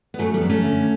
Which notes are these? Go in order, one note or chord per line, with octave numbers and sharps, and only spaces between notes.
B3
F#2 F#3 A3
G3 B3
F#2
A3 C#4
D3